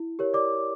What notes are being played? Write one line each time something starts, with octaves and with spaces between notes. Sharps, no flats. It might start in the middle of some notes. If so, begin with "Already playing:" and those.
Already playing: E4
G4 A#4 C#5
D5 D6